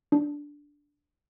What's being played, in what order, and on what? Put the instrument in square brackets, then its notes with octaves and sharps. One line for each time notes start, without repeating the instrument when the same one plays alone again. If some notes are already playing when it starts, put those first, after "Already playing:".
[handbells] D4